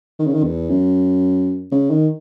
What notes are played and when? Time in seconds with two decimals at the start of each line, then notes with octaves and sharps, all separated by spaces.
0.19 D#3
0.27 C#3
0.34 D#3
0.44 E2
0.70 F#2
1.71 C#3
1.90 D#3